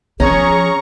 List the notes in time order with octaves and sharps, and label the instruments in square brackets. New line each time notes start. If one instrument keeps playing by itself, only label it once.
[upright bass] F3 [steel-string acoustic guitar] C#4 [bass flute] G#4 [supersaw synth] A#5 C#6